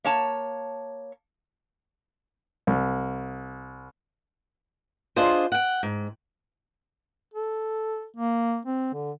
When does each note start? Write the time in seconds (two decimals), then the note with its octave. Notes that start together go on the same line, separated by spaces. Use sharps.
0.04 A#3 C#5 A5
2.67 C2
5.16 D4 F4 G#4 C5 D#5
5.52 F#5 G5
5.83 G#2
7.34 A4
8.16 A#3
8.65 C4
8.94 D3